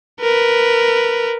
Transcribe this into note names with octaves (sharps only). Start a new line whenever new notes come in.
A#4 B4